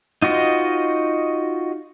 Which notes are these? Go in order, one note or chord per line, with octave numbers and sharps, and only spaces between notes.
D#4 F4 F#4 C5 D#5